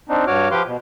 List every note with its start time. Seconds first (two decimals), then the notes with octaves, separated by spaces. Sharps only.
0.09 C4 D4 D#4
0.27 G2 F#4 C#5 D6 F6
0.51 F3 G4 B4 F5 C6 D6
0.67 B2